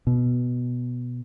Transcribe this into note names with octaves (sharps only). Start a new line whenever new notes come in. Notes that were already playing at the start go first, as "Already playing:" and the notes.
B2